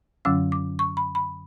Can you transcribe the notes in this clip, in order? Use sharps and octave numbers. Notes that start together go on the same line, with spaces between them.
F#2 D3 F#3 C#4 E6
D6
C#6
B5
B5